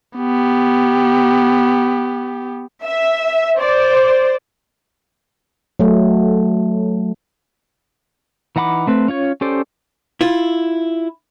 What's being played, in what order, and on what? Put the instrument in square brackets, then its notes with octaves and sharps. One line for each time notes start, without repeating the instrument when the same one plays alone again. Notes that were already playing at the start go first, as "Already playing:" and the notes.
[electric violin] B3 G4
[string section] E5
C5 D5
[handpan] F#3 A3
[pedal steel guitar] E3 D#4 F#5 B5 D6
A3 C4 B4
C#4 F4 C#5
C#4 G4 A4 C5 D5
[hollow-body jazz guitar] E4 F4